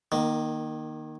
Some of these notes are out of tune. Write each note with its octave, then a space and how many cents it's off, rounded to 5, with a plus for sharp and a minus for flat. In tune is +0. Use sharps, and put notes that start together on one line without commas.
D#3 -10 A#3 +20